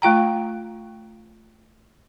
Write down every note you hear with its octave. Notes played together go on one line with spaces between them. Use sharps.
A3 F4 G5 A#5